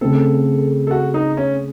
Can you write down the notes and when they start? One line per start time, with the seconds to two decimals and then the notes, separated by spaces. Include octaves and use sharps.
0.01 C#3 A3 C4 A4
0.87 A4
0.91 F#4
1.14 D#4
1.37 C#4